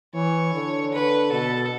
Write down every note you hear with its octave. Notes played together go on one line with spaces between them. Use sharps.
E3 C#5
D3
D3 B4
B2 A4